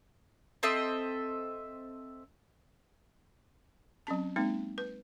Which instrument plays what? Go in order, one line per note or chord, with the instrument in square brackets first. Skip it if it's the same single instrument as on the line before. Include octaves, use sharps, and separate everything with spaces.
[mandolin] C4 A4 D#5 E5
[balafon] F#3 C4 C#4 A5
G#3 A#3 C4 D#4
B4